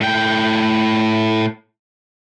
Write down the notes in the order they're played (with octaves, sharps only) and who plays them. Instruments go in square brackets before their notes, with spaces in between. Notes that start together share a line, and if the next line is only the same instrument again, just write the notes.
[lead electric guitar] A2 G5